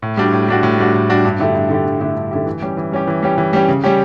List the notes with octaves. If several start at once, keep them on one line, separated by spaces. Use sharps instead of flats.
A2
G3 D4 F#4
A2
G3 D4 F#4
A2
G3 D4 F#4
A2
G3 D4 F#4
G2
D3 A3 E4 G4
G2
D3 A3 E4 G4
G2
D3 A3 E4 G4
G2
D3 A3 E4 G4
E3
G3 C#4 G4
E3
G3 C#4 G4
E3
G3 C#4 G4
E3
G3 C#4 G4
C#3
G3 C#4 G4